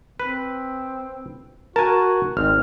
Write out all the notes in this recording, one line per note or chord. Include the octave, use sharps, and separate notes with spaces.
C4 B4
F#4 A#4 G#5 A5
G#1 G#3 C4 F6